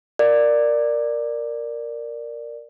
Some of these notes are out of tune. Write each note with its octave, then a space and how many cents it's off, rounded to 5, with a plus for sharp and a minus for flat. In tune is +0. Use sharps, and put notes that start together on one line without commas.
A#4 +0 D5 +10